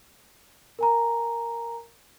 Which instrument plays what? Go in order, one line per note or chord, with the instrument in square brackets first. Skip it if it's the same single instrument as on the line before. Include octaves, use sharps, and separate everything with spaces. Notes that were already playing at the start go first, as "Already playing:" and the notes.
[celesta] A#4 G#5 A#5